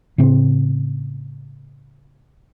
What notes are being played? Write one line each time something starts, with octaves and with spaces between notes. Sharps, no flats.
A2 C#3 C4